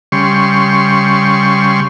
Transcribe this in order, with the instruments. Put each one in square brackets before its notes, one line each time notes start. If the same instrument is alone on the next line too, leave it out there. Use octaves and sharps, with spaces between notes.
[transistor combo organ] C#3 G3 C6 C#6